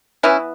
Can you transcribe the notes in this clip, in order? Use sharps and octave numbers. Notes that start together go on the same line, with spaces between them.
E3 B3 C#4 E4